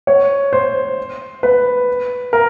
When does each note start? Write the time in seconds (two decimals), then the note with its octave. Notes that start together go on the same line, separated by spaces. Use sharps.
0.07 C#5
0.53 C5
1.43 B4
2.33 A#4